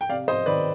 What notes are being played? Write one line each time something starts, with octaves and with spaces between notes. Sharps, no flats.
G5
C3 D5 F5
C5 D#5
D#3 B4 D5